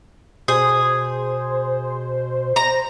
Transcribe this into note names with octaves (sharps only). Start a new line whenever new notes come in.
B2 G#4 C5
A#5